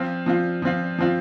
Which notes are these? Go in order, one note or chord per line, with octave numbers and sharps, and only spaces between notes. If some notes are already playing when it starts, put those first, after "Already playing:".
Already playing: F3 C4 F4
F3 C4 F4
F3 C4 F4
F3 C4 F4